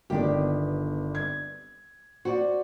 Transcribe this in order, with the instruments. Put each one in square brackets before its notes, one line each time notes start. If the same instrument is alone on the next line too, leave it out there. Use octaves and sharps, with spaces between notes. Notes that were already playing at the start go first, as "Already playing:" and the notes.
[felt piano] G1 D#3 [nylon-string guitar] B3 D4 G4
[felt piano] G#6
[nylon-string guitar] F#4 [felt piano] C5 D5